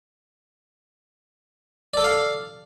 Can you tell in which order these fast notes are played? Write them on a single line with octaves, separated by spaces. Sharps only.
D5 A4 D6 F5